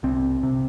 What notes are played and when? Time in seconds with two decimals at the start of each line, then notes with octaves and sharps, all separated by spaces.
0.03 C2 C4
0.43 C3